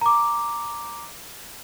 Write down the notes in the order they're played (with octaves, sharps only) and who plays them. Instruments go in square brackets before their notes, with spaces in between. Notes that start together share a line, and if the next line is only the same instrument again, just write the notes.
[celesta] A#5 D6